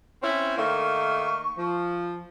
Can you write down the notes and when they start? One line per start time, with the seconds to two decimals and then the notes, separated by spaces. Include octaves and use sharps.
0.21 C4 C#4 E4
0.56 D#3 A3 A#3 C#6
1.57 F3